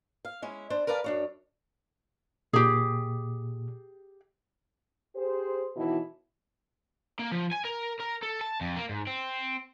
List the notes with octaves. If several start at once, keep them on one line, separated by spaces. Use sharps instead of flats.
F5
G#3 C#4 E4
D4 C5
A#4 B4 D5 F5 A5
F#2 D4 C#5
A#2 G4 G#4
G4 G#4 C5
B2 D#3 E3 F#3 E4
A#3
F3
G#5
A#4
A#4
A4
A5
F2
A#3
G#2
C4